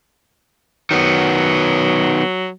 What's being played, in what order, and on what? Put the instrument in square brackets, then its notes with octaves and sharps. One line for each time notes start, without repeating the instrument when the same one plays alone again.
[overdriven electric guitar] D#3 B3 [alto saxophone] F#3